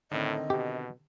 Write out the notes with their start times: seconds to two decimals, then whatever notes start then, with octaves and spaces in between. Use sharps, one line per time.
0.11 A2 D3 D#3 C4 D#5
0.50 B2 G4